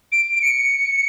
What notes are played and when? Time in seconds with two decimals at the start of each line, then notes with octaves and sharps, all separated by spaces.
0.11 D7
0.35 D7
0.41 C#7